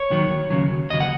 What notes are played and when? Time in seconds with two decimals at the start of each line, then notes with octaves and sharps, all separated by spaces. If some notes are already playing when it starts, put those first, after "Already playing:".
Already playing: C#5
0.10 D#2 D#3 F#3
0.50 D#2 C#3 F#3
0.90 D#2 C#3 F#3 D#5
1.00 F#5